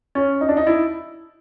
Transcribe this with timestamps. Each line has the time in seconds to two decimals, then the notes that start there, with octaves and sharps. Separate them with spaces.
0.15 C#4
0.41 D#4
0.49 D4
0.57 D#4
0.67 E4